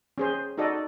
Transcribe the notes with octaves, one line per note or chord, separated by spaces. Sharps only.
C#4 G#4 C5
D#4 F#4 A4 D5 D#5